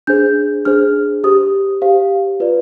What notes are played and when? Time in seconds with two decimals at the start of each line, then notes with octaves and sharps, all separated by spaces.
0.07 D4 G#4 C5 G6
0.65 D4 G#4 C5 F6
1.24 G4 C5 D#6
1.82 G4 C5 F5
2.40 F4 B4 D5